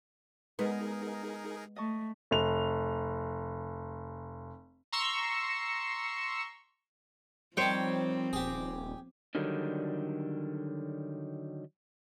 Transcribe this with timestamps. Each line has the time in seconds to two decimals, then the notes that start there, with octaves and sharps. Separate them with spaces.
0.59 G#3 B3 D#4 G#4 A#4 D#5
1.76 A3 D#5 A5 C#6
2.31 F1 F7
4.92 A#5 C6 C#6 E6
7.57 D#3 F3 G3 C4 C5 C#5 G5
8.33 D#1 G4 G#4
9.35 D3 D#3 F#3 G3